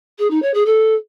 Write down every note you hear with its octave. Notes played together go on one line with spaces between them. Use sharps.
G#4
D#4
C#5
G#4
A4